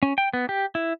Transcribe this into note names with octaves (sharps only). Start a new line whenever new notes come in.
C#4
G5
B3
G4
E4